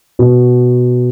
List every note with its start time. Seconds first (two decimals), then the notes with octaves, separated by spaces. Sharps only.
0.19 B2